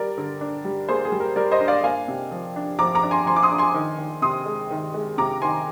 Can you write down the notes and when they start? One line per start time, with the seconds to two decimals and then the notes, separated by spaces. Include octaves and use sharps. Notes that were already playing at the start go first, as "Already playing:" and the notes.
Already playing: G3 A#4 D5
0.18 D3
0.41 D4
0.65 G3
0.89 A#3 G#4 C5
1.05 G#4
1.12 G3
1.20 A#4
1.36 G3 A#4 D5
1.52 C5 D#5
1.60 D4
1.68 D5 F5
1.84 A#3 F5 G#5
2.08 C3
2.31 F3
2.56 D4
2.79 F3 A#5 D6
2.95 A#5 D6
3.03 D4
3.11 G#5 C6
3.26 F3 G#5 C6
3.36 D6
3.43 C6 D#6
3.51 D4
3.58 G#5 C6
3.74 D#3
3.98 D#3
4.22 C3 C6 D#6
4.46 G#3
4.70 D#3
4.94 G#3
5.18 C3 A#5 D6
5.42 D#3 G#5 C6